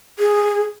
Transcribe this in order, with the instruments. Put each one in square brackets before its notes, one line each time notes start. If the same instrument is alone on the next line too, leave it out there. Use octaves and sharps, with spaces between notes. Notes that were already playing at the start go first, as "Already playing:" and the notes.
[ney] G#4